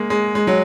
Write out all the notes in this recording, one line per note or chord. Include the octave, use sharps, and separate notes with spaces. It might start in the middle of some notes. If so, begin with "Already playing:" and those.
Already playing: G#3 A#3
G#3
G#3
F#3